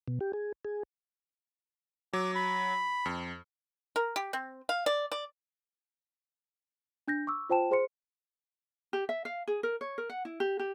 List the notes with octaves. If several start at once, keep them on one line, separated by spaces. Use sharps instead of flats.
B2
G4
G#4
G#4
F#3 D6
B5
F2
A#4
G4
C4
F5
D5
D5
D4 G6 A#6
C#6 D6 E6
F4 C5 G5 A5 E7
G#4 C5 C6 C#7
G4
E5
F5
G#4
A#4
C#5
A#4
F#5
E4
G4
G4